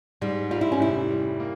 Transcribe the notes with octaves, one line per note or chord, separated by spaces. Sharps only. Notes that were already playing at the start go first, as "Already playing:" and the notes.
G#2 G3
G3 F4
E4
C#4
F1 E4
G3
A#3